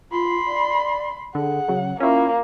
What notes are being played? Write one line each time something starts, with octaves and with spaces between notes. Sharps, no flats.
F4 B5 C6
D5
D3 G#4 F#5
C#3 F#3
A#3 C#4 E4 F4